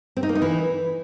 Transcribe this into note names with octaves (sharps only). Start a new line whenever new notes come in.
C4
D#4
A#3
D#4
E3